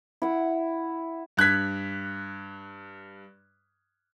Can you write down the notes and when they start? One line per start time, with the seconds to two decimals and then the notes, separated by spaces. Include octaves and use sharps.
0.22 E4 F#5
1.37 G2 F#6 G#6 B6